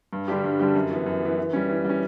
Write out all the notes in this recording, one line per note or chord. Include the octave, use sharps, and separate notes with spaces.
G2
D3 G3 D4 G4
G2
D3 G3 D4 G4
F#2
E3 B3
F#2
E3 B3
E3
G3 C#4
E3
G3 C#4